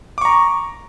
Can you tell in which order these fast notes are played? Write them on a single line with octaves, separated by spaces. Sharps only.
D6 C#6 A#5